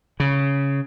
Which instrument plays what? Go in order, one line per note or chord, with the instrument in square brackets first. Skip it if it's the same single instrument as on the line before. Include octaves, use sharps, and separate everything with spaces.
[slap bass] C#3